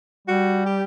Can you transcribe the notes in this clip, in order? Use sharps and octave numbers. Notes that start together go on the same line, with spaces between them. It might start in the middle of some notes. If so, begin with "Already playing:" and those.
G3 F#4
G4